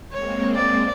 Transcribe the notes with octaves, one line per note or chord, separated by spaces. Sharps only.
G#3 A#3 C4 C#5
D5